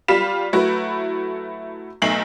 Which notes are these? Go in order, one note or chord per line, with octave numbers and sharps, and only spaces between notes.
G3 F4 B5 B6 E7
F#3 A3 E4 F#4 B4
B1 A3 C7 F#7